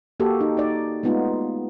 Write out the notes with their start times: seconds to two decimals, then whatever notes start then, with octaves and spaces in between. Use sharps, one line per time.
0.20 A#3 F#4 G4 A4
0.41 D#4
0.57 D#4 D5
1.03 G#3 A3 B3 D#4 F4